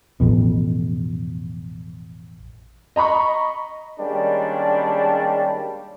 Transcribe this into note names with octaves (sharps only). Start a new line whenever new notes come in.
A1 F2 B2
D#5 A#5 B5 C#6
D#3 G3 G#3 A#3 C#4 D4